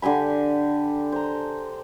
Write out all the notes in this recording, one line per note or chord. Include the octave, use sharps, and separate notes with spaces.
D3 G4 G#5 B5
C5 A#5